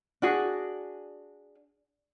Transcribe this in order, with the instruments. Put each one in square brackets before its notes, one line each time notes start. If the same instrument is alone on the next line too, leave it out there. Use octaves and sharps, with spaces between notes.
[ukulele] D4 F#4 G#4